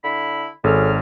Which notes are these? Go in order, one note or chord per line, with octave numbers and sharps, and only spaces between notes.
D3 E4 B5
G#1 F#2 G#4 A4 C#5 F6